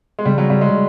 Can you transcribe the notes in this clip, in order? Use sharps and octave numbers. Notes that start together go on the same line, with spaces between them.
G#3
C#3 G3
F#3
G3
G#3